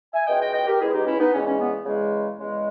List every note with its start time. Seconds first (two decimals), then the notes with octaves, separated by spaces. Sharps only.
0.14 E5 G#5
0.27 C#2 B2 G#3 D#5 G5
0.41 D#5 G5
0.53 D#5 G5
0.67 G4 A#4
0.80 C#2 B2 G#3 E4 G#4
0.93 D#4 G4
1.07 C#4 E4
1.20 B3 D#4
1.33 E2 C#3 G#3 C#4
1.47 C#4
1.60 B3
1.86 E2 C#3 G#3
2.39 E2 C#3 G#3